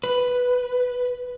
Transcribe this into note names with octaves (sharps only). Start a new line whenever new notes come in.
B4